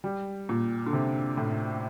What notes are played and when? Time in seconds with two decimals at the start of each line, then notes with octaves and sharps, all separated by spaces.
0.04 G3
0.49 A#2
0.86 D3
0.93 C3
1.37 A2